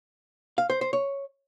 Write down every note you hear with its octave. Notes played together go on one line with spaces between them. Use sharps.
F5
C5
C5
C#5